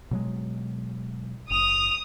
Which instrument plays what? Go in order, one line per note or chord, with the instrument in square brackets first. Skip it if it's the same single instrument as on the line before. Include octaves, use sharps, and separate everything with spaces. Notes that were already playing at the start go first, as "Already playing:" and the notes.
[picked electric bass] B2 F#3 G#3
[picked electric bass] F#1 [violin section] D#6 [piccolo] F7